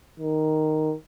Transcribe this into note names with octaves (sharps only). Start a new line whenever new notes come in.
D#3